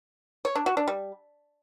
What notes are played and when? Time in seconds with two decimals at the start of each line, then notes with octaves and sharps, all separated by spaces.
0.45 C#5
0.56 D4
0.66 F#4
0.77 D4
0.88 G3